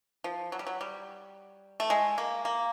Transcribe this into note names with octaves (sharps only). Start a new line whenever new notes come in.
F3
F#3
G3
F#3
G3
A3
G#3
A#3
A#3